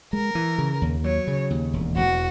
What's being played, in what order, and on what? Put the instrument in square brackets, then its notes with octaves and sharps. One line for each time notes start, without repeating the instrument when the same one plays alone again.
[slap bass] G#3 [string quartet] A#4
[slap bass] E3
C#3
D#2
[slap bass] F#3 [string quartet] C#5
[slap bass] C#3
D#2
E1
[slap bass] E1 [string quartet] F#4